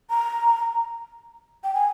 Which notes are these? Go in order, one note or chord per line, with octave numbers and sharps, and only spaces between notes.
A#5
G5
G#5